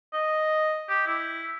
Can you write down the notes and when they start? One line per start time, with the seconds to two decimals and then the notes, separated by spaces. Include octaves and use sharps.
0.14 D#5
0.89 G4
1.07 E4